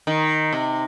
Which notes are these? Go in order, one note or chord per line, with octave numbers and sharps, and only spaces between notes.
D#3
C3